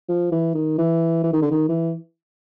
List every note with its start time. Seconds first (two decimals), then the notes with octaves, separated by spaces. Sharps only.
0.09 F3
0.32 E3
0.55 D#3
0.78 E3
1.23 E3
1.33 D#3
1.42 D3
1.51 D#3
1.68 E3